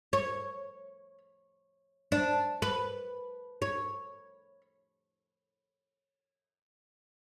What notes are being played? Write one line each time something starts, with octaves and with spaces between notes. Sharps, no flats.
C#5
D4
B4
C#5